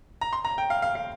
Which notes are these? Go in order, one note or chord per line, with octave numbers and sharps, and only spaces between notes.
A#5
C6
A#5
G5
F5
F5
F5